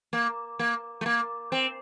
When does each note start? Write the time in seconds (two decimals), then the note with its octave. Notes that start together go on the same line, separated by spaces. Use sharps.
0.13 A#3
0.59 A#3
1.01 A3
1.06 A#3
1.52 C4